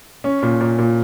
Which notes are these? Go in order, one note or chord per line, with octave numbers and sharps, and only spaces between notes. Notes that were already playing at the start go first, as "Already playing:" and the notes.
C#4
A#2
A#2
A#2